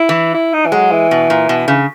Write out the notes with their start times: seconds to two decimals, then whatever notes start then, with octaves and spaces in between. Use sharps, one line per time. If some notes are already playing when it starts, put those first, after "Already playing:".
Already playing: E4
0.09 E3
0.34 E4
0.53 D#4
0.66 E3
0.72 F#3 G#3
0.92 E3
1.11 B2
1.30 A#2
1.49 B2
1.68 C#3